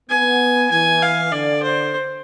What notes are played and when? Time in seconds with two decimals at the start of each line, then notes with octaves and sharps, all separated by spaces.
0.10 B3 G#5
0.71 E3 G#5
1.02 F5
1.32 D3 D5
1.63 C5